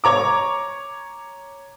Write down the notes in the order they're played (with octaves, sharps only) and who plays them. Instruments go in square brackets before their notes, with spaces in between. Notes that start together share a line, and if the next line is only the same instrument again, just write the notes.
[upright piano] C#5 A#5 D6